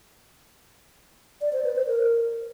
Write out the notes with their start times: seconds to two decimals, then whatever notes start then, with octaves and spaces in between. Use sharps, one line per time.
1.41 D5
1.53 C5
1.64 B4
1.76 C5
1.87 A#4